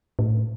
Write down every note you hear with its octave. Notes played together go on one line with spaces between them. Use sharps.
A2